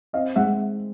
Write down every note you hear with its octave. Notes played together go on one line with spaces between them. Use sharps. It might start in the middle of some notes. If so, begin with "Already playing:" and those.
C4 D#5 F5
G#3 E5 F#5